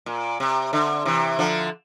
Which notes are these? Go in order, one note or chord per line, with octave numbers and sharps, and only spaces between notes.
A#2
C3
D3
C3 E3
D3 F3